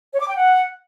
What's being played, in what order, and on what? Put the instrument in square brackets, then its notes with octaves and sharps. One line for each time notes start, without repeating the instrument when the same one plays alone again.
[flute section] C#5
D6
G5
F#5